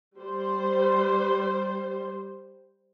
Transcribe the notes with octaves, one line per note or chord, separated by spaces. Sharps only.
G3 C5